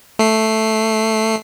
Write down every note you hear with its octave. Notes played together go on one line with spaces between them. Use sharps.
A3 C7